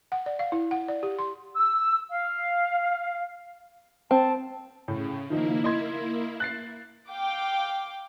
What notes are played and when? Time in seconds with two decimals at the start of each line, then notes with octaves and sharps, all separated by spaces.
0.12 F#5
0.26 D5
0.39 F5
0.52 E4
0.71 F#5
0.88 D5
1.03 G4
1.19 C6
1.55 E6
2.09 F5
4.11 C4 A5
4.88 A2 C#3
5.30 D#3 F3 A#3 D#4 E4
5.64 D#5 C6 G#6
6.40 F#6 A6 C7
7.09 F5 G5 D6